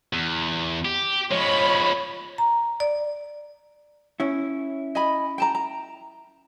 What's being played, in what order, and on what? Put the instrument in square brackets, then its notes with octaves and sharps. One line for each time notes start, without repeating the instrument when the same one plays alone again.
[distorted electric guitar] E2
G4
[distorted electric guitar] F3 G#3 [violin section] C#5 B5
[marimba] A#5
D5
[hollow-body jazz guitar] C#4 E4
[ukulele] D#5 G#5 B5
G5 A5 A#5
A#5